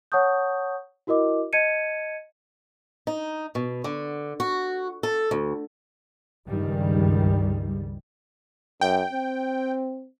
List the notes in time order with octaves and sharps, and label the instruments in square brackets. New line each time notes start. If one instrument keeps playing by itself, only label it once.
[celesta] C#5 F#5 A5 C#6 D#6 G6
E4 F#4 A#4 D#5 D6
D#5 A5 G#6 C#7 D#7
[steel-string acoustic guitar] D#4
B2
D3
F#4
A4
D2
[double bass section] C#2 G2 D#3 G3
[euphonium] F#2 [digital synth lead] G5
[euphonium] C4